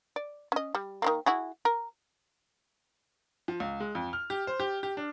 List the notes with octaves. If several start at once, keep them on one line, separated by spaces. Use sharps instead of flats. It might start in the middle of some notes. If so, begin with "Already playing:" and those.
D5
C#4 D#5
G3
D#3 G#3 A#3
E4 F#4 G#4
A#4
F3
C#2
G#3
F2
F6
G4
C5
G4
G4
D4